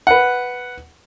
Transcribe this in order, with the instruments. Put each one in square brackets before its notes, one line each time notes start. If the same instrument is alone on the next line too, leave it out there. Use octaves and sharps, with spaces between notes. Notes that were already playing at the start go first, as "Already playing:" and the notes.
[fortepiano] B4 F#5